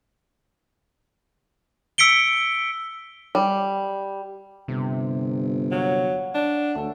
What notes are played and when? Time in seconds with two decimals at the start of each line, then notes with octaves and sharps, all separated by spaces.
1.98 E6 B6 C#7 D7 G7
3.35 G3
4.68 G1 C3
5.72 F#3 C#5 F5 F#5
6.35 D4
6.75 D2 A3 A4